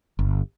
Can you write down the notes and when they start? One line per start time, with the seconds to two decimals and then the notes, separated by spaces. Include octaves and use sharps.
0.19 G1